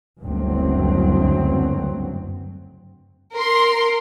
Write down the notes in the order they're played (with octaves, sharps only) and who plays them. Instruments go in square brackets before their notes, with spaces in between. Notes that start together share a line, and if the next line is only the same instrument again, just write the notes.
[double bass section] F#1 D2 G2 F#3 C4
[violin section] A#4 C6